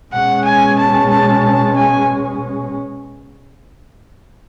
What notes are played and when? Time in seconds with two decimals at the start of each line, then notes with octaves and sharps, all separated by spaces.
0.12 B2 G#3 C#4 F#5
0.44 G#5
0.78 A5
1.10 A5
1.42 A5
1.76 G#5